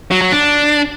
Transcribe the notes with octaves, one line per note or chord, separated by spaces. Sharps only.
F#3
F#3
D4